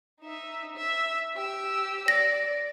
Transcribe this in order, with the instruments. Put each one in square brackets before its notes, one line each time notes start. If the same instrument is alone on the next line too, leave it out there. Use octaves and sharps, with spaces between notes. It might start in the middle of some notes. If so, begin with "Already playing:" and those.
[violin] D#4 E5
E5
G4 E6
[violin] D5 [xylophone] A#6